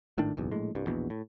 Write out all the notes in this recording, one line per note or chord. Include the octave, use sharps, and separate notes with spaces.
G#1 A2 D#3 D4
F#1 B1 E2
A#1 A2 G#3
C2 G2
A#1 E2 B2
A2